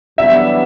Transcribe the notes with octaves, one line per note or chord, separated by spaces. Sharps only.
F#2 E3 G3 B3 D4 E5